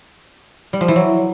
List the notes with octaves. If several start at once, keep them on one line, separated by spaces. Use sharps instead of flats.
G3
F3
E3
F#3